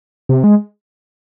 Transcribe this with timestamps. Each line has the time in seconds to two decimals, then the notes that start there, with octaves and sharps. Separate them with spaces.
0.29 C3
0.44 G#3